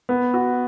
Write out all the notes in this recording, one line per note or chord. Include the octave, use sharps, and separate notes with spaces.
B3
F#4